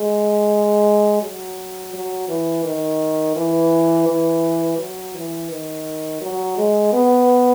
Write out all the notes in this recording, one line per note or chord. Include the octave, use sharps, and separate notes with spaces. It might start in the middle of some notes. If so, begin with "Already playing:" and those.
Already playing: G#3
F#3
F#3
E3
D#3
E3
E3
F#3
E3
D#3
F#3
G#3
B3